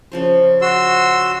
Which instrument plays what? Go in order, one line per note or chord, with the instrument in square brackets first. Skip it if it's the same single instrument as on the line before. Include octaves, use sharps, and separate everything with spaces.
[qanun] C#3 F3 C5
[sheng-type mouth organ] F#4 C6 E6